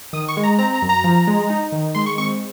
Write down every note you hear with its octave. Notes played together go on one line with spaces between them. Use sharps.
D#3 D#6
C#6
G#3
A#5
C4 A#5
A#5
F#2
A#5
F3
G#3
D#4
D#3
G#3 C6
C#6
C4 C#6